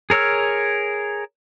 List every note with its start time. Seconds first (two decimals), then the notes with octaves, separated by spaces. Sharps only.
0.10 G#4 A#4 C#5 E6 F6